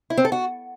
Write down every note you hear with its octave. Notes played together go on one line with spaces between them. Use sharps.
E4
C4
A4
F#4